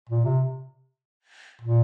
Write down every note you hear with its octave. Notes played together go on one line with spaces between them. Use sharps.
A#2
C3
A#2